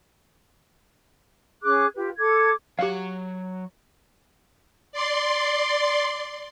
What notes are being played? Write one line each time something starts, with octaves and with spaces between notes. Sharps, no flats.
C#4 G#4 D6 F#6
F4 G4 B4
A4 D6 G#6
F#3 G4 F5 F#5
D5 C6